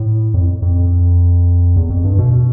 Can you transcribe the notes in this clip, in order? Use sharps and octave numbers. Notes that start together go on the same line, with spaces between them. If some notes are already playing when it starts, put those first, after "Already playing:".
Already playing: A2
F2
F2
E2
F2
G2
B2